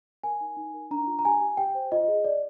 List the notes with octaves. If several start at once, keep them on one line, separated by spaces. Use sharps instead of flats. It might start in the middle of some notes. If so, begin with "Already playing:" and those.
A#4 G#5
D#4
D#4
A#4
D4 A#5
F4
A#5
G4 G#5
G4
G4 G5
C5
F4 D#5
G#4
D5